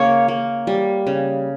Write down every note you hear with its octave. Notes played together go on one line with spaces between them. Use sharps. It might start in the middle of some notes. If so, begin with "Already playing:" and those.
Already playing: C#3 A#3 C#5
A#3
G3
C#3